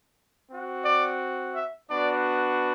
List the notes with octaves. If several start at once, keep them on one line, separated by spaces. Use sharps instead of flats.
C4 F#4
D5
E5
B3 D4 F#4 D5